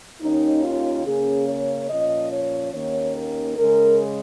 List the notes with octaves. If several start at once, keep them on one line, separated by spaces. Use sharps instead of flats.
D#2 D#3 C#4 D#4
F4
C#3 A#3 C#4 G#4
C#5
A#2 F3 C#4 D#5
C#5
D#2 D#3 A#3 C#4 C#5
A#4
C#3 G#3 C#4 A#4